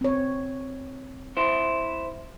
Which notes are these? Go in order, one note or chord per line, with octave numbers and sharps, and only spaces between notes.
C4 C#5
E4 C5